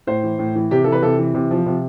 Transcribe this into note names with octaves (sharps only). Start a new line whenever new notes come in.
A2 C5
E3
A2
E3
C3 G4
E3 A4
B4
C3 A4
E3
C3
F3
C3